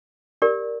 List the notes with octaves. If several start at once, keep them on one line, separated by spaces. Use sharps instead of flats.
G4 A#4 D5